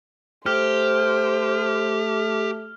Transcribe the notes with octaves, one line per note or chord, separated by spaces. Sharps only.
A3 G4 C5 F6